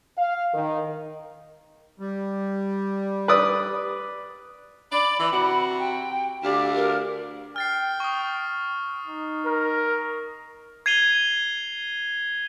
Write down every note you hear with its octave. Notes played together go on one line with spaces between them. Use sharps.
F5
D#3
G3
B4 D5 D#6
D5 B5
E3
C3 F#4
G5
D2 G4 D5 F5
A#4
G5 F6 A6 C7
C#6 D#6
D#4
A#4
G#6 C7 D#7 F7 G7